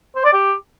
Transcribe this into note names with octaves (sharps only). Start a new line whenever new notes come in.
C5
D5
G4